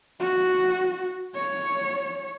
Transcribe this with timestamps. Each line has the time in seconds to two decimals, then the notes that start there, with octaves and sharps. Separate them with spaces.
0.20 F#4
1.36 C#5